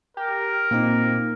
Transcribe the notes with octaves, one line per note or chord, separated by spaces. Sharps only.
G4 A#4
A#2 A#3 C4 D#4